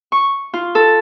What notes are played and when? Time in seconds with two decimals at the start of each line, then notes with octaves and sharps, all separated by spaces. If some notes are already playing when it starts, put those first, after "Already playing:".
0.12 C#6
0.54 F4
0.75 A4